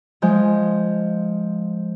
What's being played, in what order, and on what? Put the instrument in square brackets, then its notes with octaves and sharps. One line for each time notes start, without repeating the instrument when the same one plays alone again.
[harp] F3 G#3 G6